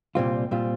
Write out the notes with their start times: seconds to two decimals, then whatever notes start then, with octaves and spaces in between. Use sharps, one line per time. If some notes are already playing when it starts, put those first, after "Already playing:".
0.15 C2 A#2 G3 C4 F4
0.51 A#2 G3 C4 F4